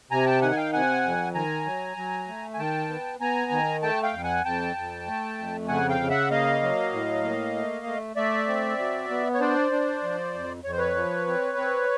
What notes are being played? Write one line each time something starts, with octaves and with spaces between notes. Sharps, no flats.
C3 G#5 A#5
G5 A5
D#3 F#5 G#5
G#5
F5 G5
C3 F#5 G#5
F2
D#3 G#5 A#5
F#3
F#3
A3
G#5
D#3 G5 A5
B3
B3 G#5 A#5
D#3
A3 G5 A5
F5 G5
F2
F#5 G#5
F2 G5 A5
F2
A3
F2
C#3 F#5 G#5
F5 G5
C#3
E5 F#5
A#3 D#5 F5
F#3
A2
A#3
A3
A3
A3 D5 E5
C4
F#3
B3
C#5
D4 C5 D5
D4
F3
F2
F2 C#5
C5
B4 C#5
F3
C4
C4